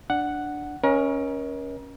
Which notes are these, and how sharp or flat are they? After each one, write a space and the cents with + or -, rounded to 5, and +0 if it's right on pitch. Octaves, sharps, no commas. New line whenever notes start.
D4 +0 F#5 +0
C#4 +0 A#4 +35 D#5 +25